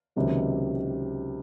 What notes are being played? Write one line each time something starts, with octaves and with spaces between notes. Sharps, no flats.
C#2 C3 D#3 F#3 A#3